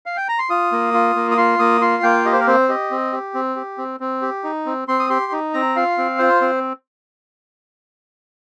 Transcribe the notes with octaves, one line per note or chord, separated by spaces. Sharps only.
F5
G5
A#5
C6
F4 D#6
A#3
F4
A#3
D#6
F4 C6
A#3 D#6
F4 C6
A#3 G5
G4 D#5
C5
A#4
C4 C5
G4 D#5
C4
G4
C4
G4
C4
C4
G4
D#4
C4
C4 C6
D#6
G4 C6
D#4
C4 A#5
F4 F5
C4
F4 C5
C4